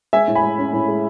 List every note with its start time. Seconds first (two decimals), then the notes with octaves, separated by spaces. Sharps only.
0.13 G#3 E5 G#5
0.28 A2
0.35 G#5 B5
0.43 G#3
0.58 C#4
0.73 A2
0.88 G#3